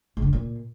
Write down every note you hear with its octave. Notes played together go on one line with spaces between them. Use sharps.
G#2
D3
G#2
A#2